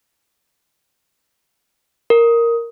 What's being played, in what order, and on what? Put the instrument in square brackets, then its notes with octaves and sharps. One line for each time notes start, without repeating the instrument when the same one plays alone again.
[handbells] A#4